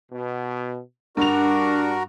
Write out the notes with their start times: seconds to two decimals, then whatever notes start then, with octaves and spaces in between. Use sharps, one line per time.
0.12 B2
1.17 G2 D4 F#4 A#4 F7